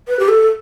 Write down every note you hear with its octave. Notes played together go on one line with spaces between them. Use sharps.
B4
G4
A4